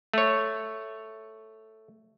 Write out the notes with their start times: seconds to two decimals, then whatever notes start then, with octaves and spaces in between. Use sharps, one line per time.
0.14 A3 C#5